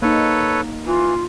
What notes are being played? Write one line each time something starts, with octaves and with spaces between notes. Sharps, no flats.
A#3 D#4 A4 B4 C#5
E3 F4